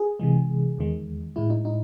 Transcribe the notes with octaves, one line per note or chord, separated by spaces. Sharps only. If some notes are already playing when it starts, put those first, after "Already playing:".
Already playing: G#4
C3 E3 G#3
E2 D#3 G#3
A2 G#3 E4
D#4
D#4